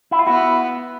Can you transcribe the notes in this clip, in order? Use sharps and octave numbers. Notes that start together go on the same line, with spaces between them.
E4
F4
B3 E4 F#4